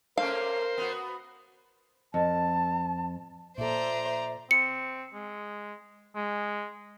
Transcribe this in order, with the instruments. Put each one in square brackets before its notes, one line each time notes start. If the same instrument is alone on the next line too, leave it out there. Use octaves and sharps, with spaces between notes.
[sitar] A3 A#3 C#4 [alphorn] A#4 [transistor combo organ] C5 [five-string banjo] F5
[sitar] B3 F#4
[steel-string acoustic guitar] F2 [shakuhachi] A5
[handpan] A#2 A4 [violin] C5 [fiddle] D5 A#5 [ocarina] E5
[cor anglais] C4 [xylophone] C#7
[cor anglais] G#3
G#3